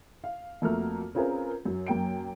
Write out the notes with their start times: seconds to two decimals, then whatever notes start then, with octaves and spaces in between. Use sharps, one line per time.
0.24 F5
0.62 F2 A3 A#3 F#4 A#5 F6
1.15 C4 C#4 F4 G#4 A#4 B4
1.65 F#2 F#3
1.87 F#2 A#3 G5 D7